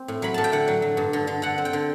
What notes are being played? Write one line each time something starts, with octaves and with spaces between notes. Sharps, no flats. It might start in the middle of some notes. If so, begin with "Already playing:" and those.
Already playing: C4
A2
F#3 B5
A2 A5
G5
D3 F#5
F#3
F#3
G2
D3
D3
D3 F#5
C4
G5
D3